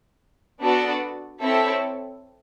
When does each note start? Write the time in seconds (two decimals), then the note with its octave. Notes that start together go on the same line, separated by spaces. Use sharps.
0.62 B3 D4 F#4 A4 D5
1.42 C4 E4 A4 C#5 E5